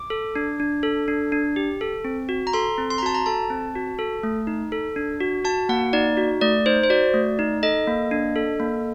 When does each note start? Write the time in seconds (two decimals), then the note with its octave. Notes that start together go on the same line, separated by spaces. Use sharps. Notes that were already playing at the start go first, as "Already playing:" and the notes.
Already playing: D6
0.10 A4
0.36 D4
0.60 D4
0.83 A4
1.08 D4
1.32 D4
1.56 G4
1.81 A4
2.05 C4
2.29 F#4
2.47 A#5
2.53 A4 C6
2.78 C4
2.90 C6
2.98 A#5
3.02 F#4 A5
3.15 A#5
3.26 A4 A5
3.50 C4
3.75 F#4
3.99 A4
4.23 A3
4.47 D#4
4.72 A4
4.96 D4
5.21 F#4
5.44 F#4 A5
5.69 A#3 F#5
5.93 D#4 D5
6.17 F#4
6.41 A3 D5
6.66 D#4 C5
6.84 C5
6.90 F#4 D5
7.14 A3
7.39 D#4
7.63 A4 D#5
7.87 A#3
8.11 D4
8.36 A4
8.60 A#3